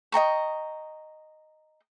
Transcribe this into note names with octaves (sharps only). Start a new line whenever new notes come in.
D#5 G5 A#5 C#6